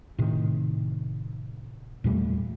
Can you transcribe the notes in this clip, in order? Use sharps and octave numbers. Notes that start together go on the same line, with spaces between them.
A2 C3 D#3
E2 A#2 G3 A3